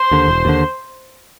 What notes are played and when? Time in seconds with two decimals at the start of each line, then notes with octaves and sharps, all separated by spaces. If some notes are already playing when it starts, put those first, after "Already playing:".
Already playing: C5
0.11 D#2 D3
0.28 E1
0.45 D#2 D3